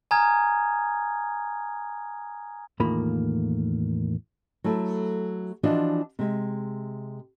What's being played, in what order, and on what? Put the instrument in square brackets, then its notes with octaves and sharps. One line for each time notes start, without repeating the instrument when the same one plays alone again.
[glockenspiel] G#5 A#5 D#6 F6 G#6
[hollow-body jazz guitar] E2 A2 D#3 A#3 F4 B5
[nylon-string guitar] F#3 A3 E4 A4
E3 F3 D4 F4 F#4 D#5
C3 G#3